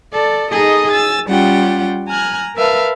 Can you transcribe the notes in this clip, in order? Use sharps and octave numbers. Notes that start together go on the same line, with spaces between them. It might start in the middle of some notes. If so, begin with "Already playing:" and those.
A4 D5
D#4 G#4 A4 D#5 A#5
G#5 E6 A6
G3 C#4 F4 G4 F#5 G5
G#5 A#5 F6 F#6 G#6
A#4 B4 E5 F5 A5